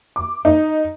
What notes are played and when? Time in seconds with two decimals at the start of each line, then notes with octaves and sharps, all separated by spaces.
0.16 D6
0.45 D#4